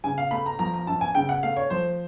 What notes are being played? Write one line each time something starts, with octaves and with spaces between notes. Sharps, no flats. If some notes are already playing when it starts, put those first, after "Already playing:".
C#3 G#5
F5
A3 B5
A#5
F3 A#5
A#5
F#2 A5
G#5
C#3 G5
F#5
A3 F5
C#5
F3 C5